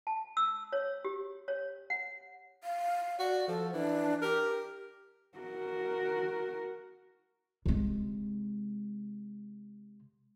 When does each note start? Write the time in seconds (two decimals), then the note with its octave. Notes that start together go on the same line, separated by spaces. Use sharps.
0.07 A5
0.37 E6
0.73 C#5
1.05 G4
1.48 C#5
1.90 F#5
2.64 F5
3.19 F#4 D5
3.48 F3 A4
3.73 E3 D4
4.22 G4 A#4
5.38 F#4 A#4
7.66 C3 G#3